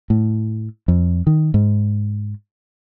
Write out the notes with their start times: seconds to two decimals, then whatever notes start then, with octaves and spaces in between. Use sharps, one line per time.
0.10 A2
0.88 F2
1.27 D#3
1.54 G#2